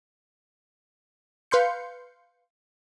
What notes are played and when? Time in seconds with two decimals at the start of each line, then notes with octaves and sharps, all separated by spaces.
1.51 B4 F5 C6 G6 C#7